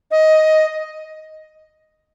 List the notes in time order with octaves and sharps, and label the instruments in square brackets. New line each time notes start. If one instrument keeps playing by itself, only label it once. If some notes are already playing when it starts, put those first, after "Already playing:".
[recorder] D#5